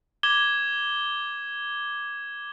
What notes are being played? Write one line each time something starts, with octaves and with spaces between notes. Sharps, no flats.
D6 G#6 E7 G7